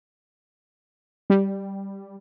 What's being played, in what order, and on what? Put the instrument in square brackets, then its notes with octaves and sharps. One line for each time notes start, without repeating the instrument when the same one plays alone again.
[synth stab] G3